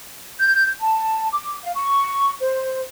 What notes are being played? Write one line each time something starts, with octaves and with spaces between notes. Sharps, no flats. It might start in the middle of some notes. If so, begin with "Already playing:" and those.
G6
A5
D6
F5
C#6
C5